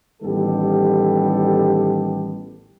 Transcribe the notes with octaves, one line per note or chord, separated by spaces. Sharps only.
A1 D#3 G3 B3 G4 A4